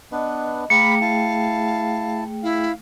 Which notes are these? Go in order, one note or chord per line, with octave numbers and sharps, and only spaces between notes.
B3 D4 B4 D#5
A3 G#4 F5 G5 A#5 B5 D6 C#7
E4 F5 A5
E4 F5